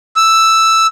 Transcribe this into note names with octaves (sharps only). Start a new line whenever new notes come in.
E6